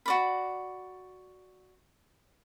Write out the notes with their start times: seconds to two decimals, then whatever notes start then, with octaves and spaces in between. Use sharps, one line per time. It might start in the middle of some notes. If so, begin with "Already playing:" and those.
0.06 F#4 D5 B5